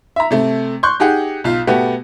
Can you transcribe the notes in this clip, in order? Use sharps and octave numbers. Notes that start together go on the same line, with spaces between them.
E5 A#5
C3 A3
C6 C#6 F#6 G6
D#4 G4 G#4 F#5
B1 F4
B2 A3 B3 F#4 G4